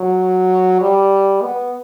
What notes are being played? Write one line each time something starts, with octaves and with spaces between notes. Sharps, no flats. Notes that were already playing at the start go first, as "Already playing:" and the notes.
Already playing: F#3
G3
B3